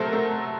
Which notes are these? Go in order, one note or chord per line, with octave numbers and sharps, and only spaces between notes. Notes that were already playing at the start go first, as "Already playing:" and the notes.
Already playing: C3 F#3 A3 A4 A#4 C5
A3